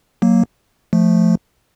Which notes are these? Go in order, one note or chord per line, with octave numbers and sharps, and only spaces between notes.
F#3 A#3
F3 A3